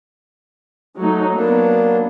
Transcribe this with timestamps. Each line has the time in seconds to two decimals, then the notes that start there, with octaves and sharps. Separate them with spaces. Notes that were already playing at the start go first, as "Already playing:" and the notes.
0.97 F#3 A3 D#4
1.35 F#3 A#3 B3 D4